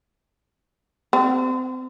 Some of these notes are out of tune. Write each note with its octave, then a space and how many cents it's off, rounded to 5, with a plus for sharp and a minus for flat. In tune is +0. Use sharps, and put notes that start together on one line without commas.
C4 -30